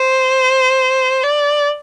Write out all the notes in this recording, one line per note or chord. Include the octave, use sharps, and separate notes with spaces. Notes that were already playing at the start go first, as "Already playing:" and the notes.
Already playing: C5
D5